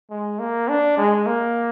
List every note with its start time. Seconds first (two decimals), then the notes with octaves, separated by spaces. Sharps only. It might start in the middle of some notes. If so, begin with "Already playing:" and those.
0.10 G#3
0.39 A#3
0.68 D4
0.97 G#3
1.26 A#3